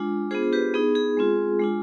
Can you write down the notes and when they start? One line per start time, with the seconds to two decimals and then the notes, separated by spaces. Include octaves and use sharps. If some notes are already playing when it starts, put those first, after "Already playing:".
Already playing: G#3 D4 F4
0.31 B3 D4 F4 G#4 C5
0.43 G#4
0.53 G4 B4
0.74 B3 D#4 G#4
0.95 G#4
1.17 G#3 C4 F4
1.59 G#3 D4 F4